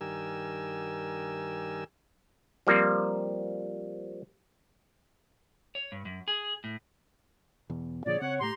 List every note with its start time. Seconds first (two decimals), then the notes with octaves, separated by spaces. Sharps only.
0.01 G2 D#3 G4 A#4 G#5 E6
2.67 F3 G3 A#3 C4 F4
5.75 C#5
5.92 G2
6.05 F#2
6.28 G#4
6.64 A2
7.70 E2 B2
8.06 A#2 D3 F3 G#4 C#5 D5
8.21 C#3 C4 C#5 F#5
8.40 A2 A3 G4 A#5 C6